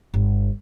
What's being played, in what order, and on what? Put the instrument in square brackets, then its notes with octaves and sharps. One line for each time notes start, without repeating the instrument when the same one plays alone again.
[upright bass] G1